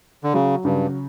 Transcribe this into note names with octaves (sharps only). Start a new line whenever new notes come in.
D3
C#3 F#3
G2 C#3